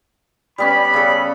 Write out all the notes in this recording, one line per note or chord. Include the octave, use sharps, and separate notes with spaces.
G3 B3 C#4 B5
C#3 A4